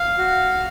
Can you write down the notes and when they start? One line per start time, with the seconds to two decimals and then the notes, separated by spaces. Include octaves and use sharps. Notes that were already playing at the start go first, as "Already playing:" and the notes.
Already playing: F5
0.18 F#4